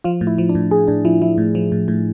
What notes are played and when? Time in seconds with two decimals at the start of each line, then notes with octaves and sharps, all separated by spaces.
0.04 F3 F4
0.21 A2
0.27 E4
0.38 F3
0.49 D4
0.55 A2
0.71 A2 G#4
0.88 A2 D4
1.05 F3 E4
1.22 F3 E4
1.38 A2
1.55 F3
1.72 A2
1.88 A2